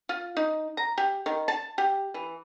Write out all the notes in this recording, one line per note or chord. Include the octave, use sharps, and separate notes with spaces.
F4
D#4
A#5
G4
D#3
A5
G4
E3